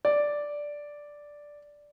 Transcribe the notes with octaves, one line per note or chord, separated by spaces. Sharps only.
D5